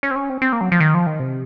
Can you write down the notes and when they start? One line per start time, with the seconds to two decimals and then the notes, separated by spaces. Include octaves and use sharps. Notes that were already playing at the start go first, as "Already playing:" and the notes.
0.03 C#4
0.11 C4
0.16 C#4
0.30 C4
0.42 C4
0.52 A#3
0.61 F#3
0.72 F3
0.80 D#3
0.94 F3
1.07 D#3
1.20 C3